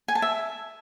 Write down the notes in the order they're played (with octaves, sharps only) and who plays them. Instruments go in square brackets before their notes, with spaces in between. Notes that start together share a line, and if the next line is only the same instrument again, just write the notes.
[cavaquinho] G#5
A5
E5